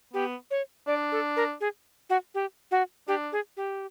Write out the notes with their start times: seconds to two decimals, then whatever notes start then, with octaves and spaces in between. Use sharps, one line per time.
0.13 B3 G4
0.51 C#5
0.87 D4 D5
1.12 A4
1.36 A#4
1.61 G#4
2.10 F#4
2.35 G4
2.71 F#4
3.08 D4 G4
3.32 G#4
3.57 G4